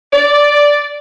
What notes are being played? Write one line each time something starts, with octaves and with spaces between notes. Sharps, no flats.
D5